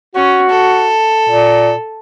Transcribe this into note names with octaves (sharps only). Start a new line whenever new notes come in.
C#4 F#4
A4
A#2